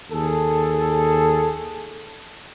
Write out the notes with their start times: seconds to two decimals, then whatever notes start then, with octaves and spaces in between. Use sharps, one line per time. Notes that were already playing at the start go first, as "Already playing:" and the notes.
0.11 D#2 G#4 A4